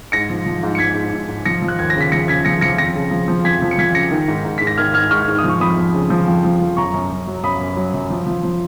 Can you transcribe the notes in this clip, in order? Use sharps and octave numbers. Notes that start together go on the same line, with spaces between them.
G#2 A#6 C#7
F3
F3
G#2
C#7
G#2 G#6 B6
G#2
G#2
G#2
F3 A#6 C#7
F3
F#6
D#2 G#6
A#6
C#3 B6
F3 A#6 C#7
C#3 G#6 B6
F3 A#6 C#7
F3 A#6 C#7
F2 A#6 C#7
C#3
F3
F3
F2 G#6 B6
F3
C#7
F3 G#6 B6
C#3 A#6 C#7
D#3
G#2
G#2
G#2 B6
A#6
D#3 F6 G#6
G#2 F6 G#6
G#2 C#6 F6
G#2 F6
D#6
F3
C#6
F2 B5 D#6
F2
C#3
F3
F2
F3
F2
F#2 A#5 C#6
F#2
F#2
F#3
F#2 B5 D#6
F#2
F#3
F#2
F3
F3
F3